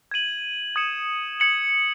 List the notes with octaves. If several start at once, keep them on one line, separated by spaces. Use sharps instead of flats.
G#6 D#7 F#7
D#6 G#6 C#7 E7
G#6 C#7 F#7